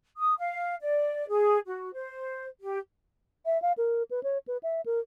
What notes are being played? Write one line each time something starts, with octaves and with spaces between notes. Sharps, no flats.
D#6
F5
D5
G#4
F#4
C5
G4
E5
F5
A#4
B4
C#5
B4
E5
A#4